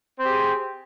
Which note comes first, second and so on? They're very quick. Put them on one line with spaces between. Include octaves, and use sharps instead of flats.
C4 G4 G#4